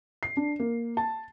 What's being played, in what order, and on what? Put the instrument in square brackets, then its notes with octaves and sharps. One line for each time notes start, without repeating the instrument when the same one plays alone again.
[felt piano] C7
D4
A#3
A5